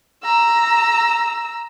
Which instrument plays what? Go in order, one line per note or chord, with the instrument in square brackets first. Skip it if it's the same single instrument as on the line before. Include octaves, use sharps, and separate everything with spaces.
[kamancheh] A#5 E6